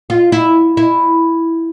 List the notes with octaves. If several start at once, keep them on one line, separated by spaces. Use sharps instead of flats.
F4
E4
E4